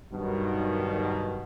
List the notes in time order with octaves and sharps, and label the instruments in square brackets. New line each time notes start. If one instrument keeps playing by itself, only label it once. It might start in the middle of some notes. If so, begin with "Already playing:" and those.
[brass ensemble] G2 B2 D#3 F#3